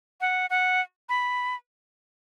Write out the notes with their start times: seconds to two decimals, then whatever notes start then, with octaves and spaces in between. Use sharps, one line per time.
0.21 F#5
0.50 F#5
1.09 B5